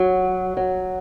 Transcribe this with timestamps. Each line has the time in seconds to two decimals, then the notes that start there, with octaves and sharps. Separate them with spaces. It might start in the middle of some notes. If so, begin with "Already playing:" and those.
Already playing: F#3
0.57 F#3